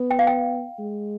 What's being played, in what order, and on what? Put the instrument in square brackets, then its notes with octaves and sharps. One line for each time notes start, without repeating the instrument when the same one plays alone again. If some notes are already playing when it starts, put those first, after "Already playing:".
Already playing: [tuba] B3
[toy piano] G5
F5
G5
[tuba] G#3